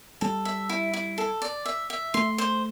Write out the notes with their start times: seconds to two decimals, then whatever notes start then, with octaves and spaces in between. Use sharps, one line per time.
0.21 G3 A4
0.45 E5
0.69 E4
0.93 E4
1.18 A4
1.42 D5
1.66 E5
1.90 E5
2.14 A3 C6
2.38 C5